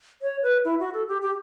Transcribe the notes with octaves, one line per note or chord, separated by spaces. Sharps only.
C#5
B4
E4
F#4
A4
G4
G4